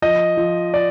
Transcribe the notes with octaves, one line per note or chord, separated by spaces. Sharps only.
F3 D#5
F3
D5